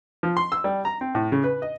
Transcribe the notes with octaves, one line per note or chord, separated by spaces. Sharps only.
F3
C6
E6
G3
A#5
C4
A2
C#3
B4
D#5